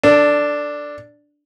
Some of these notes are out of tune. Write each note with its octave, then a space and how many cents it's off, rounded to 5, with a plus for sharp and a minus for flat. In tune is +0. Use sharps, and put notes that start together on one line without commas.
D4 +0 A4 +25